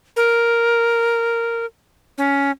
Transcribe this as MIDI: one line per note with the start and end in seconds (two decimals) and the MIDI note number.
0.16 1.66 70
2.18 2.51 61